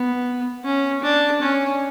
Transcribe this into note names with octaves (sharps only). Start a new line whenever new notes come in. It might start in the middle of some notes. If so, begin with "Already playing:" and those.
Already playing: B3
C#4
D4
C#4